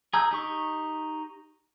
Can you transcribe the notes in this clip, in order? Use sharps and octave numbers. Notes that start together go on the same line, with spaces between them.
G#4 A#5 E6 G6
D#4 G4 C#6